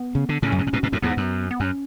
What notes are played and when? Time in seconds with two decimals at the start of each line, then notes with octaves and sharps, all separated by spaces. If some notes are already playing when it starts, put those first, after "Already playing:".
Already playing: B3
0.15 C#3
0.29 D3
0.42 A2 C#3 C#4
0.52 F#2
0.59 G#2
0.67 A2
0.73 G#2 B2
0.83 G#2 B2
0.92 F#2 A2
1.02 E2 G#2 B3
1.17 F#2
1.51 B3
1.60 F#2 C#4